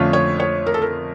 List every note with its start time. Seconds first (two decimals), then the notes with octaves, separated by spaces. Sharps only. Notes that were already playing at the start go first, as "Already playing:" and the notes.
Already playing: F2 D3 A3 C#4 F4
0.13 C#5
0.40 C#5
0.66 A#4
0.74 A4
0.82 A#4